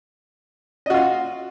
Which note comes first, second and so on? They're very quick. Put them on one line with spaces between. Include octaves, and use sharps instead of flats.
D#5 F#4 F4